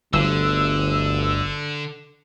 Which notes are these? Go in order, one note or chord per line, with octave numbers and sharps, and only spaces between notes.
G1 D2 D3 E6